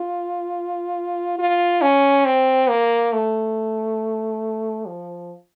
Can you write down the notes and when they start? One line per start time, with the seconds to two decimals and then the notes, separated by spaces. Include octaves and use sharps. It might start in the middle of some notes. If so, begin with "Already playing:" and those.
Already playing: F4
1.39 F4
1.82 C#4
2.25 C4
2.69 A#3
3.13 A3
4.87 F3